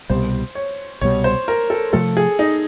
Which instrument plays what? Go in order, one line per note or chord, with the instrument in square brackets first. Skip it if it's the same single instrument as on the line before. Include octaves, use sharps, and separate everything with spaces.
[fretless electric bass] C2 B2 G3 [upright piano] C5
[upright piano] C#5
[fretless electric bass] C2 B2 G3 [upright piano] C#5
[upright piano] C5
A#4
A4
[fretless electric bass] C3 F3 A3 [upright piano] A4
[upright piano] G#4
D#4